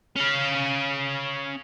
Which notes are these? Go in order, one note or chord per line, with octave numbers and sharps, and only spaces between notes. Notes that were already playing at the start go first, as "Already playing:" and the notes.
C#4 F5